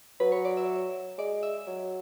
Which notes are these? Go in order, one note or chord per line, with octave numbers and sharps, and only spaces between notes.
F#3 B4
C#5
D5
E5
G#3 D5
E5
F#3